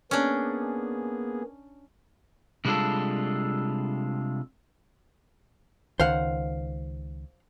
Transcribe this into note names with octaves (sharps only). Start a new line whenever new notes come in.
A#3 B3 C#4 D4 G#4
C3 G3 G#3 D4 F4 A4
C#2 D#3 C5 F5 F#5